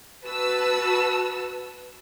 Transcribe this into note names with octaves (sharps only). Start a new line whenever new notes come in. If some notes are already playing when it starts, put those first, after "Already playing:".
F#4 B4 A5 E6